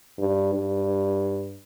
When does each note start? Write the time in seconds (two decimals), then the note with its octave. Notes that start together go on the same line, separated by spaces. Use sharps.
0.19 G2
0.53 G2